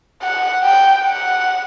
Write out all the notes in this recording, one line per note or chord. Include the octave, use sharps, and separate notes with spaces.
F#5
G5
F#5